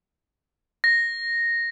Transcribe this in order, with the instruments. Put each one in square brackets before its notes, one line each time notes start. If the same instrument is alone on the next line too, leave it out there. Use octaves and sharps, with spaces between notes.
[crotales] A#6